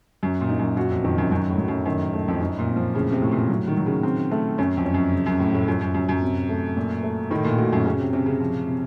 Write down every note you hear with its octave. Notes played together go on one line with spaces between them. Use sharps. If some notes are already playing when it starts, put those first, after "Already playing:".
F#2 F#3
A#2
D#4
F#2
F#2 F#4
F2
F2 D#3
F#2
F#2 F#3
A2
F#3
F#2
F#2 D#3
A3
F2
F#2 D#4
A#2
C4
F3
A2 C#3
C3
A2
A#2
F#3
D#3
F#3
C#3
C4
A3
F#2 C#4
F2
C#4
F#2
C#3
F#2
A2 F3
A2
F#2 F4
F#2
F#2 F#3
F#2
C3
A3
A#2
A3
A2 D#3
A#2
A2 F#4
F#2
C#3 C#4
C3
C3 C#4
C#3
F3
C3